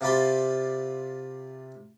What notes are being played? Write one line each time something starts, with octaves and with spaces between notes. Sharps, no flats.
C3 F4 D5 B5 C6